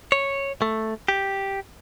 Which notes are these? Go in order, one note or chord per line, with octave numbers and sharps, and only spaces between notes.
C#5
A3
G4